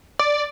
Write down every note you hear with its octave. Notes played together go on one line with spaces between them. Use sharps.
D5